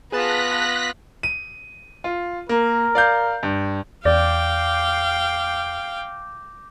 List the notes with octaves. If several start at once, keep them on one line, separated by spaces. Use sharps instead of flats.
B3 F4 G#4 B4 A5 F#6 A#6 B6
D#7
F4
A#3 A#4
D5 F5 G6
G2
E2 D5 F5 G5 D6 G6 A#6